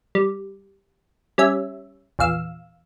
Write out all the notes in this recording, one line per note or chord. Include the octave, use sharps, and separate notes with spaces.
G3
G3 C#4 E5
A#1 E2 F5 E6